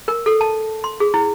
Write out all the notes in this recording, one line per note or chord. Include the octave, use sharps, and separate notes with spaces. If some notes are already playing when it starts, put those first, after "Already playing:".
A#4
A4
A5
C6
G#4
E4